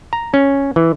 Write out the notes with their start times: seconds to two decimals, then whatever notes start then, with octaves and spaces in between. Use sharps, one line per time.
0.13 A#5
0.34 C#4
0.76 E3